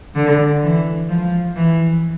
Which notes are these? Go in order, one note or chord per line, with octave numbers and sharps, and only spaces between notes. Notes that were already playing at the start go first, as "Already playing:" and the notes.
D3
E3
F3
E3